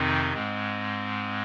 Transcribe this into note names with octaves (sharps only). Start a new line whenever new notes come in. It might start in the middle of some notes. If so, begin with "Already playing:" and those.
Already playing: F2 C3 D#3 C4 D#4
G#2 G#3 C4